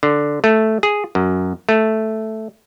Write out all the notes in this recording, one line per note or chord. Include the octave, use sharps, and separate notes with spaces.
D3
A3
G#4
F#2
A3